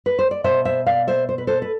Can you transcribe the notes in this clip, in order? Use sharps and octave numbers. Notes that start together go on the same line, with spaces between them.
B4
C5
D5
B2 C5 E5
C5 E5
D5 F5
C5 E5
C5
B4
A4 C5
B4